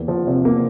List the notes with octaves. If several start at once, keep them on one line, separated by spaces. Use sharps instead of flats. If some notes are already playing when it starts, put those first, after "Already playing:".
Already playing: E2 A#3
F3
C3
A#3